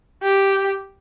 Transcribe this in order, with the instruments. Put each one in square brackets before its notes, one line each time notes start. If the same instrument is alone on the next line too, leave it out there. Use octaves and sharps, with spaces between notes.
[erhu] G4